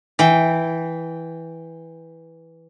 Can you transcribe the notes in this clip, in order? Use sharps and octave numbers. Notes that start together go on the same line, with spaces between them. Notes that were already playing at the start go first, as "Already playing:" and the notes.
E3 G5